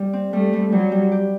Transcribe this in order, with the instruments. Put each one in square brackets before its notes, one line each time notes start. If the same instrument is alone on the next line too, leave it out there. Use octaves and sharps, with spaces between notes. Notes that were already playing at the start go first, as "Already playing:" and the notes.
Already playing: [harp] G3
C4
[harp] G3 [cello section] A3
[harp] G3
[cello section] F#3 [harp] G3
[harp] G3
G4